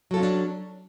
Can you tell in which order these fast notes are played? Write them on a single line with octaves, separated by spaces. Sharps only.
F#3 A4 F4 C#4 D4